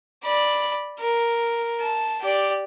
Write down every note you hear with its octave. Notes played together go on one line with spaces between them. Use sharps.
D5 B5
A#4
A5
G4 D5